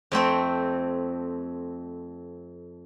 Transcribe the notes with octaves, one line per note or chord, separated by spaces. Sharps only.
F2 A3 C4 G5